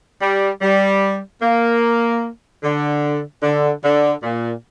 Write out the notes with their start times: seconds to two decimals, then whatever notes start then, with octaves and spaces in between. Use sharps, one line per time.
0.22 G3
0.62 G3
1.43 A#3
2.63 D3
3.43 D3
3.84 D3
4.23 A#2